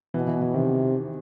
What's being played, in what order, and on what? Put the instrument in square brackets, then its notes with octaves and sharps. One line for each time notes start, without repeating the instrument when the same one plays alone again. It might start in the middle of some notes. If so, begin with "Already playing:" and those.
[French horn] B2 [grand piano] E3
[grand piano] E3
E3
[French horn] C3 [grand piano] D#3